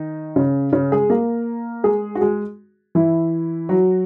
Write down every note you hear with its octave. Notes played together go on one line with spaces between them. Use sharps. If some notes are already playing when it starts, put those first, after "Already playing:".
Already playing: D#3 D#4
C#3 C#4
C#3 C#4
G#3 G#4
A#3 A#4
G#3 G#4
F#4
G#3 G#4
E3 E4
F#3 F#4